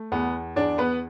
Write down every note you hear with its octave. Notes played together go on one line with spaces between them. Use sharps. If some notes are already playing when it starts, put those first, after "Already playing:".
Already playing: A3
E2 B3
E2 D4 D5
B3 B4